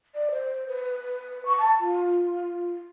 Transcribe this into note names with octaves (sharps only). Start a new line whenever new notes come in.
D5
C5
B4
C#6
A5
F4